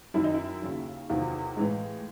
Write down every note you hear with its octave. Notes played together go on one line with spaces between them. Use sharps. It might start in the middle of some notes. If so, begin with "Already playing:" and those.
F#2 D#3 F#3 E4
D#4
E4
D#2 C#3 F#3
E2 C3 D#3 F#3 F4
A2 E3 G#3